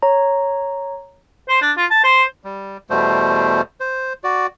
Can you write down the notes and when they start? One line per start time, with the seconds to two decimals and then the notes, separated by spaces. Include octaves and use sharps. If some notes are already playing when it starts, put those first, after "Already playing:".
0.02 C#5 A#5
1.49 C5
1.61 D4
1.77 F4
1.90 A5
2.04 C5
2.44 G3
2.90 E2 B2 G3 A3 C5
3.80 C5
4.24 F#4 D5